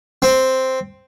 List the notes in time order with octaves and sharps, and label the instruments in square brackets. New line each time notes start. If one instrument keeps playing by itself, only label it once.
[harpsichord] C4